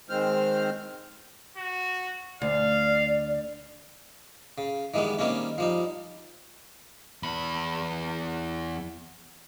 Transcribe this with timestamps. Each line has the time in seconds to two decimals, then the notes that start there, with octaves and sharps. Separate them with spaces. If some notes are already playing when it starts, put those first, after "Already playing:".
0.10 D#3 G#3 C4 C5 F6
1.57 F#4
2.42 D2 D5 F5
4.58 C#3
4.94 D#3 E3 G3 G#3 B3
5.19 D#3 G3 A#3 C4 C#4
5.58 F3 G3 D#4
7.23 E2 B5